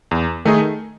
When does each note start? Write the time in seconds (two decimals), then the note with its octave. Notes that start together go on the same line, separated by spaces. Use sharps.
0.11 E2
0.45 D#3 A3 D#4 G#4